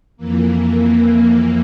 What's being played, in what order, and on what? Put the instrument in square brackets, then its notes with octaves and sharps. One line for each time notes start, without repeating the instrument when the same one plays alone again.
[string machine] F2 E3 A#3